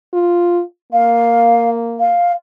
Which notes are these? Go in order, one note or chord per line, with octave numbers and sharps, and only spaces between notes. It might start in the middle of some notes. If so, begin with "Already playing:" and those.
F4
A#3 F5
F5